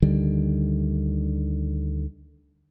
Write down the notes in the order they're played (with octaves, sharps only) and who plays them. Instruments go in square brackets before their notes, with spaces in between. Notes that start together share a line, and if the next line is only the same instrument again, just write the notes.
[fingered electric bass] D2 D3 D#3 G3